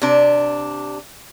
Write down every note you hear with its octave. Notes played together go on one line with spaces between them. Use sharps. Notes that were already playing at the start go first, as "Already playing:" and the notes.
C3 D4